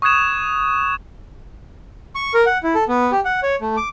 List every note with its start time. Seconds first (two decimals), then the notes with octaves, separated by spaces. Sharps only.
0.02 C#6 D#6 F#6 G#6 E7
2.15 C#6
2.34 A#4
2.46 F#5
2.63 E4
2.75 A4
2.88 B3
3.12 G4
3.25 F#5
3.43 C#5
3.61 A3
3.77 D6